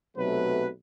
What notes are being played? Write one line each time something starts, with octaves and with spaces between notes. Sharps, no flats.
B1 C3 F#3 A3 B4